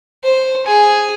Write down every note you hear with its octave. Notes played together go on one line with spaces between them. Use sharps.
C5
G#4